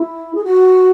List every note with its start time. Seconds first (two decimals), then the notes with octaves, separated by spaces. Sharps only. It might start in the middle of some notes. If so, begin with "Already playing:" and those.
Already playing: E4
0.34 G#4
0.43 F#4